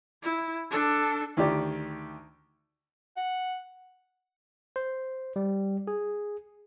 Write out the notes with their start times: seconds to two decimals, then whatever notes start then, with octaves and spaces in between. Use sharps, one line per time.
0.22 E4
0.70 D4 A4
1.37 D2 D#3 G4 D5
3.17 F#5
4.76 C5
5.36 G3
5.87 G#4